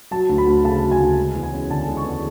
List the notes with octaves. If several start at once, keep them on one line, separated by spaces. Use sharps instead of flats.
F#3 A5
D2
B5
D2
C#3 A5
F#3
G#5
D2
G#3
E2
G#5
C#4
D3 A5
G#3
C#6
E2